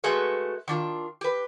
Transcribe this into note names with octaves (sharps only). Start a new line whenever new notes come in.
G#3 A3 F#4 G#4 A4 B4
D#3 D4 F4
G4 B4